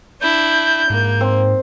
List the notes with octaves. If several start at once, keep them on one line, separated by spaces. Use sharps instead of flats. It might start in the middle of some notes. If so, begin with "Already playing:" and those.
D4 E4 G6
G#2 A#3
C4